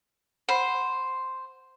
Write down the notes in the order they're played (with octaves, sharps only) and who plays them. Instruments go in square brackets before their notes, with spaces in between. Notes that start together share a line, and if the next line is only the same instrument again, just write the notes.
[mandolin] C5 [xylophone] F#5 B5